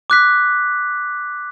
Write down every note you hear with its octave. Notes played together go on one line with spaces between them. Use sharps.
D6 F#6 B6